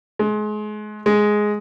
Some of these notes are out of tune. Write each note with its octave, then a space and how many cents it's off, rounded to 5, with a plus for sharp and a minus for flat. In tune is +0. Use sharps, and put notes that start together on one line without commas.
G#3 +30
G#3 +5